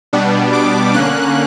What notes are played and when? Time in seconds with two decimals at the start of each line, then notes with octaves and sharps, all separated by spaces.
0.13 B2 G3 B3 D4
0.53 D6
0.94 D3 A#3 C#4 F#6